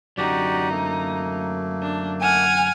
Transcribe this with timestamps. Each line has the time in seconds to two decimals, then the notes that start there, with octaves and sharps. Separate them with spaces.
0.18 F#2 D3 D#4 F#4 G4 D5
0.70 A3 A#3
1.82 D4
2.22 F#5 G#5 F6